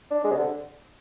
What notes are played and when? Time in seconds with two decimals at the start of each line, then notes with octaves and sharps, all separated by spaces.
0.11 D4
0.24 G#3
0.31 C3
0.37 D3